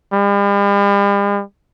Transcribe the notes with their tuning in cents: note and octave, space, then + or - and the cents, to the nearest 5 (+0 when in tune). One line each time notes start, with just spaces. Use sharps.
G3 +45